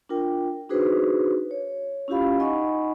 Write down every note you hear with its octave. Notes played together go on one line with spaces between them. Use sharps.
D4 F4 A#4 G5
D4 D#4 F#4 G#4 B4 C5
C#5
C#4 E4 F4 G4 F5 B5
D#4 D#5 F#5 G#5 B5 C#6